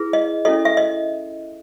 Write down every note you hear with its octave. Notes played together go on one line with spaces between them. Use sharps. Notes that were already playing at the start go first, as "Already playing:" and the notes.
Already playing: E4 G#4 B4
D#5
C#4 E4 A4 D#5
E5
D#5